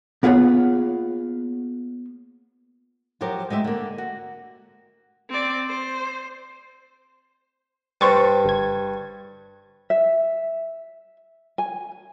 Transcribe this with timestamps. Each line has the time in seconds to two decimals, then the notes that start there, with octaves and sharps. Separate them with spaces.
0.23 A#3 B3 F4 G#4 C#5 F#5
3.21 F3 F#3 F4 G4 A#4
3.50 G#3 A3 G4 E5
3.64 D3 A#3
3.98 F#4
5.29 C4 D5
5.68 C5
8.01 G2 C5 C#6 A6
8.44 G1 G#6
9.90 E5
11.58 G#5